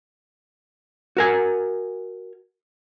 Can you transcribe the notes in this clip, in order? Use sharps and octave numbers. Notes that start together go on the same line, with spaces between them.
F#4 A#4 G#5